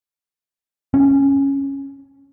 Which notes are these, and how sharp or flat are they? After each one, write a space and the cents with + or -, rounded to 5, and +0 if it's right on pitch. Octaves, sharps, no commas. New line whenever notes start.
C#4 -10